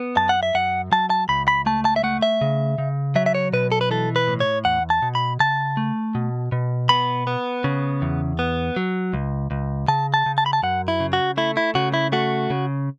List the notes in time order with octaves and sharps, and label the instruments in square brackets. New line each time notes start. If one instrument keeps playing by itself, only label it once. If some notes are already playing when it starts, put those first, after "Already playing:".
Already playing: [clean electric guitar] B3
F#2 A5
F#5
E5
F#2 F#5
F#3 A5
A5
C#2 B5
B5
A3 A5
A5
E5
A3 F#5
E5
C#3
C#3
F#3 E5
E5
C#5
B2 B4
A4
B4
E3 A4
B4
A2
C#5
E2 F#5
A5
B2
B5
C#3 A5
A3
B2
B2
B3 B5
B3
C#3
E2
B3
F#3
C#2
C#2
C#3 A5
A5
C#3
A5
B5
A5
F#2 F#5
E4
C#3
F#4
A3 E4
E4
C#3 F#4
E4
A3 F#4
C#3